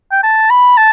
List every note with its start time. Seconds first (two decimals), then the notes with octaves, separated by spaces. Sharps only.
0.11 G5
0.23 A5
0.50 B5
0.77 A5